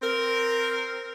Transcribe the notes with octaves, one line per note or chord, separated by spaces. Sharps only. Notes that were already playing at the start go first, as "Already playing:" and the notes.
C4 A#4